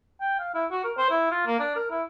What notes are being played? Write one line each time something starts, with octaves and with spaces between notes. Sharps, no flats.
G5
F5
E4
F#4
A#4
C5
E4
F4
A#3
D4
A#4
E4